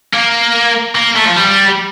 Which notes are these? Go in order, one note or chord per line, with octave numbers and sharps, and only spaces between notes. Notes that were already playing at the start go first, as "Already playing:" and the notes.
A#3
A#3
A3
F3
G3